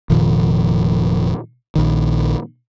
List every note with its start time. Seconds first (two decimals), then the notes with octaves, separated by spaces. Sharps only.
0.10 F1 A#2 D#3 F3
1.76 A#1 D#3